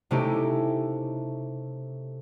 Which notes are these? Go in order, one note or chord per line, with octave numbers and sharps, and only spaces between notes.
C3 A3 C#4 D#4 E4 G4